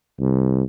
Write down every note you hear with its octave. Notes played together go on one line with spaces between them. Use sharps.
C2